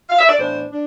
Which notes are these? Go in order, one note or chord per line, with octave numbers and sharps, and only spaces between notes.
F5
E5
D5
A2 E3 B3 D4 C5
D4